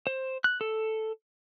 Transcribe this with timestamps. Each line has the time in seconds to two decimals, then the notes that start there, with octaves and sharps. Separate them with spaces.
0.07 C5
0.44 F#6
0.61 A4